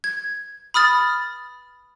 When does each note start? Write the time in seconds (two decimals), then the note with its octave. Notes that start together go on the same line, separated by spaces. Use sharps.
0.04 G#6
0.74 B5 D#6 F6 A6